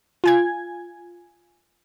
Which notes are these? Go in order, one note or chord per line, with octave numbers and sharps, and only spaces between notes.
F4 G#5 G#6